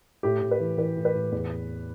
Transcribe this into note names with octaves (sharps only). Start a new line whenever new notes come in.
A2 G4
A2
B4
E3
E3 B4
A2
B4
A2
E2